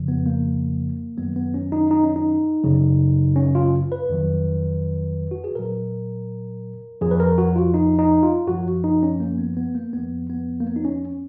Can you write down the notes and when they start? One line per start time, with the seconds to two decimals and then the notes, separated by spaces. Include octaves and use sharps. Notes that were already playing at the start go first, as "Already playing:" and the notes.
Already playing: F2 C#3 F3
0.08 B3
0.26 A#3
1.17 F#2 D#3 F#3 B3
1.36 B3
1.54 C#4
1.72 D#4
1.91 D#4
2.03 C#4
2.16 D#4
2.63 F#2 C#3 F#3
3.36 C#4
3.55 F4
3.92 B4
4.09 F2 D#3 F#3
5.31 F#4
5.44 G#4
5.55 A#2 F#3 A#4
7.01 F2 F3 G#4
7.11 B4
7.20 A#4
7.38 F#4
7.56 F4
7.74 D#4
7.99 D#4
8.23 F4
8.47 F#2 F3 F#4
8.84 D#4
9.03 C#4
9.20 A#3
9.38 B3
9.57 B3
9.75 A#3
9.93 F2 F3 B3
10.30 B3
10.60 A#3
10.67 B3
10.76 D#4
10.85 C#4